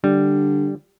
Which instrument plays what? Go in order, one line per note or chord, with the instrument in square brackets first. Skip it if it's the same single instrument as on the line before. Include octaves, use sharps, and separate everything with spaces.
[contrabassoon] D3 [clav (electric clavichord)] G3